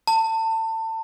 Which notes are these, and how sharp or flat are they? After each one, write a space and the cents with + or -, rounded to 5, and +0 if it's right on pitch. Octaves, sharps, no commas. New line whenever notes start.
A5 +30